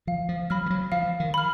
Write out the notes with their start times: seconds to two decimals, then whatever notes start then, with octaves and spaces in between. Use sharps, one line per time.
0.07 F3 F5
0.29 F3
0.50 F#3 B5 F6
0.66 F3
0.70 F#3
0.92 F3 F5
1.20 D#3
1.34 B5 F6